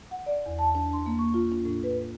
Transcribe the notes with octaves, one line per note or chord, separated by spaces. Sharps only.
F#5
D5
E2
A5
D4
C6
A#3
C#6
F4
D4
A2
B4